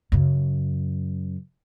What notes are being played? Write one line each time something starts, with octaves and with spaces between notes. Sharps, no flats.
F#2 C#3